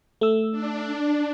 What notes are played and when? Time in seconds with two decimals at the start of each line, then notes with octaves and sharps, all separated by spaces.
0.21 A3 E6
0.52 D4